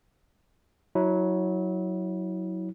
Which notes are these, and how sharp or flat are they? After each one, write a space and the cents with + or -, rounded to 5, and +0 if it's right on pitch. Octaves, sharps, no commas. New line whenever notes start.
F#3 +0 E4 -30